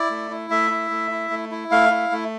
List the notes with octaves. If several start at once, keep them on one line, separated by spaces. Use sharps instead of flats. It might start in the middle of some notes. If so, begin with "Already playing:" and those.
Already playing: E4 D5
A3
E4
A3 E5
E4
A3
E4
A3
E4
A3 F5
E4
A3